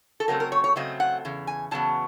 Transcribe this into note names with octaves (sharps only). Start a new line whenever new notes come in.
A4
C#3 F#3 A3 C4 A#4
A#4
C#5
C#5
C#3 F#3 A3 C4 D#5
F#5
E2 C#3
G#5
E2 C#3 F#3 B3 A5